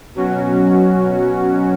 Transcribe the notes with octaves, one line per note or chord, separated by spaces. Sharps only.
B2 F#3 C#4 F#4